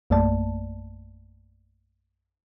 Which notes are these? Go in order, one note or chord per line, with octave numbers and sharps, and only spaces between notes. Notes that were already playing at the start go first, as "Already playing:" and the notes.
A#1 F#2 A3 A#3 D5 A5